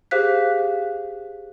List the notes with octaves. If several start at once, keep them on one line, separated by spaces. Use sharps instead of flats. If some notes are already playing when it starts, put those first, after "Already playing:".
G4 G#4 C5 F5 F#6 B6